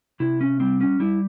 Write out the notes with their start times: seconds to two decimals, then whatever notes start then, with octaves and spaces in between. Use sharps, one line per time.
0.20 C3 E4
0.41 C#4
0.60 G3 C4
0.81 C#4
1.00 G3 E4